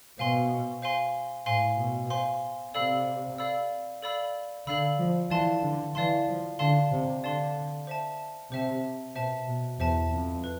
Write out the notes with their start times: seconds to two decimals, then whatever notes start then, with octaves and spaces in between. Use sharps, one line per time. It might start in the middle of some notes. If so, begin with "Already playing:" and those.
0.18 B2 C5 F5 G#5 C6
0.82 C5 F5 G#5 C6
1.46 A2 C5 F5 G#5 C6
1.78 B2
2.10 C5 F5 G#5 C6
2.74 C3 A4 D5 F5 B5 E6
3.38 A4 D5 F5 B5 E6
4.03 A4 D5 F5 B5 E6
4.67 D3 A4 D5 F5 B5 E6
4.99 F3
5.30 E3 D5 F5 A5 C6
5.63 D3
5.95 E3 D5 F5 A5 C6
6.27 F3
6.59 D3 D5 F5 A5 C6
6.91 C3
7.23 D3 D5 F5 A5 C6
7.87 C5 E5 A5
8.51 C3 C5 E5 A5
9.15 B2 C5 E5 A5
9.47 B2
9.79 E2 C5 E5 A5
10.11 F2
10.44 B4